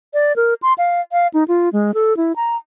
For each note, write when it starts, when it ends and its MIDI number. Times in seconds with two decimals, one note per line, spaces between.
0.14 0.35 74
0.36 0.54 70
0.62 0.73 84
0.78 1.01 77
1.12 1.27 77
1.34 1.44 63
1.48 1.69 65
1.73 1.92 56
1.94 2.16 69
2.17 2.33 64
2.36 2.56 82